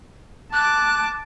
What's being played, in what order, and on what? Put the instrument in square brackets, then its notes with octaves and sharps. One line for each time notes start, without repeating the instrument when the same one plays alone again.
[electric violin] A5 D6 [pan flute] F#6